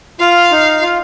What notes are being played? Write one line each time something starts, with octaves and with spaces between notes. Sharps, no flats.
F4 F5
D#4
F4